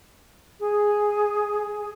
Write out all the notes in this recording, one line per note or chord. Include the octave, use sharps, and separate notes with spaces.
G#4